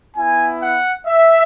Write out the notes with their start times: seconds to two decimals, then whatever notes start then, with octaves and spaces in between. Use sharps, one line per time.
0.16 B3 E4 G#5
0.61 F#5
1.06 E5